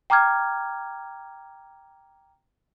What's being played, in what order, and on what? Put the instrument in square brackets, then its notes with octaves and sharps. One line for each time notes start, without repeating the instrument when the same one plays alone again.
[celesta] G5 A#5 D6 F6 G#6